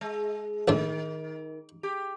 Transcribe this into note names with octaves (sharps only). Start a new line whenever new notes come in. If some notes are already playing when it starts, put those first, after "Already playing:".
G#3
A#1 A2 D#3 D4
G4